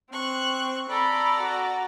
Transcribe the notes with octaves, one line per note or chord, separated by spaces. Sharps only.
C4 C#6 F#6
A4 D5 A#5 B5
F#4